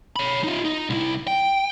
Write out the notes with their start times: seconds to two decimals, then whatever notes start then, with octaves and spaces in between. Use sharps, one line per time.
0.16 C#5 B5
0.44 D#4 F4
0.65 D#4
0.90 C2 E4
1.27 G5